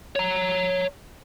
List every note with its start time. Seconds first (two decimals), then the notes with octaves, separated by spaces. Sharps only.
0.16 C#5 A#5